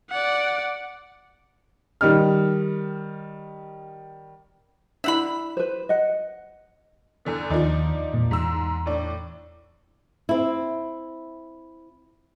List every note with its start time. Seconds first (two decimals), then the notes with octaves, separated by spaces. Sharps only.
0.11 D5 F#5
2.01 D#3 G3 D#5 F6
5.04 D4 E4 E5 F#5 B5
5.57 B4 C5
5.89 D#5 F#5
7.25 E2 D3 B3
7.50 D#2 F3 D4 D#4
8.14 E1 A#2
8.31 E2 G#2 E6
8.86 A2 D4
10.29 C4 E4